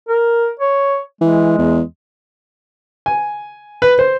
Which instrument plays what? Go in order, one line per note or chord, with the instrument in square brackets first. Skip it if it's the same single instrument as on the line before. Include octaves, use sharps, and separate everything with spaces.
[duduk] A#4
C#5
[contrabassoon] E3 [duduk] G#3
[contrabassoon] E2
[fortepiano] G#5
B4
C5